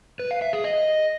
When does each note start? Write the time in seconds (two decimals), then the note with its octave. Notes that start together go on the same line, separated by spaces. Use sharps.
0.20 B4
0.31 F5
0.42 E5
0.53 G#4
0.64 D#5